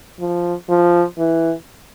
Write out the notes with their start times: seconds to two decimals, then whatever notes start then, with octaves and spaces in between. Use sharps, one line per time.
0.20 F3
0.69 F3
1.18 E3